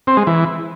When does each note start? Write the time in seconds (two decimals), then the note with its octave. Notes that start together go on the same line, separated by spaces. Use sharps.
0.07 C4
0.17 G#3
0.27 E3